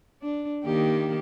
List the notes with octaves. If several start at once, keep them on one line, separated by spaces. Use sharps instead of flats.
D4
D#3 A#3 G4